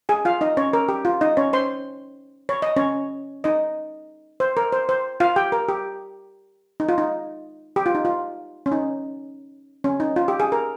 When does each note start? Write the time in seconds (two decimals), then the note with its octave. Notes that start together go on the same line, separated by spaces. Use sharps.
0.09 G#4 G#5
0.25 F4 F5
0.41 D#4 D#5
0.57 C#4 C#5
0.73 A#4
0.89 G4
1.05 F4
1.21 D#4 D#5
1.37 C#4 C#5
1.53 C5 C6
2.49 C#5
2.62 D#5
2.76 C#4 C#5
3.44 D#4 D#5
4.40 C5
4.57 A#4
4.72 C5
4.89 C5
5.20 F4 F5
5.36 G4 G5
5.52 A#4
5.69 G4
6.80 D#4
6.89 F4
6.98 D#4
7.76 G4
7.86 F4
7.95 D#4
8.05 F4
8.66 C#4
8.72 D#4
9.84 C#4
10.00 D#4
10.16 F4
10.28 G4
10.40 G#4
10.52 A#4